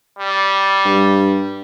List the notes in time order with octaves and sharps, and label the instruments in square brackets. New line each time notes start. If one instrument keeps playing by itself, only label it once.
[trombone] G3
[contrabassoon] G2